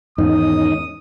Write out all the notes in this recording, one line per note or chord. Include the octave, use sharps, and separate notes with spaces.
E2 G#2 D#3 C#4 D#4 D#6